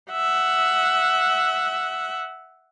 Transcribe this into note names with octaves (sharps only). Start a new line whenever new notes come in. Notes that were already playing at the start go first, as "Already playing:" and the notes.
E5 F#5